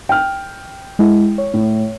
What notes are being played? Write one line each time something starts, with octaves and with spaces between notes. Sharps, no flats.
G5 F6
G#3 E4
C#5
A2